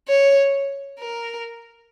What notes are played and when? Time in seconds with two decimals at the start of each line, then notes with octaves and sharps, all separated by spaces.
0.08 C#5
1.00 A#4